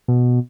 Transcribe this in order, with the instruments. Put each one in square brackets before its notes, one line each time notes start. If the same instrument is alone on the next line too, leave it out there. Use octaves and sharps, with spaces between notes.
[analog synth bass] B2